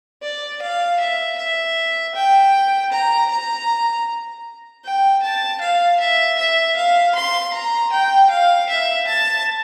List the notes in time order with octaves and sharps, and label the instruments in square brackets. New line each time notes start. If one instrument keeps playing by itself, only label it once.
[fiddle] D5
F5
E5
E5
G5
A#5
A#5
G5
A5
F5
E5
E5
F5
C6
A#5
G5
F5
E5
A5